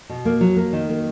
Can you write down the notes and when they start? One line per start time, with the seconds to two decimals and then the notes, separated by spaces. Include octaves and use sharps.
0.09 B2
0.25 A#3
0.41 F#3
0.57 A#3
0.73 D#3
0.89 A#3